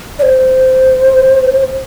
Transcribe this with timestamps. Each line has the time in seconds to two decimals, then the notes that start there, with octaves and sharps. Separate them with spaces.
0.19 D5
0.23 C5